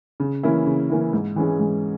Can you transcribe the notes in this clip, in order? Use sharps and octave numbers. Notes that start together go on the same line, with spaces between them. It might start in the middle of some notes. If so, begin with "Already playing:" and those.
C#3
E3 A#3 C#4 E4
C#3
E3 A#3 C#4 E4
G#2
E3 G#3 C#4 G#4
G#2